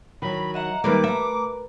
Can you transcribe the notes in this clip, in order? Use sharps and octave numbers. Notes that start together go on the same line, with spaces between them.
D#3 F#3 B5
D#5 E5 F#5 A#5
D#3 G3 A#3 A#4 B4 D6
A3 E5 A#5